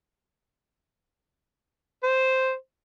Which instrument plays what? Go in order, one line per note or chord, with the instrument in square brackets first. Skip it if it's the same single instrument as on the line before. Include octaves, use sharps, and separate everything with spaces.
[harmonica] C5